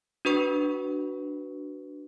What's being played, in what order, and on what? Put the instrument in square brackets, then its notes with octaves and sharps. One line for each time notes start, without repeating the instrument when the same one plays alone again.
[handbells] D4 F#4 B4 C#6